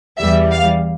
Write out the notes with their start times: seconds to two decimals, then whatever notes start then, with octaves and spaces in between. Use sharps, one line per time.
0.18 E2 E3 G3 E5
0.52 F5